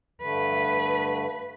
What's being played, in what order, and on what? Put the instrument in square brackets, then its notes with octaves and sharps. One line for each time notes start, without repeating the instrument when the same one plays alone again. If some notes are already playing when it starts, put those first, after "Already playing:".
[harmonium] G2 D3 A3 [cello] B4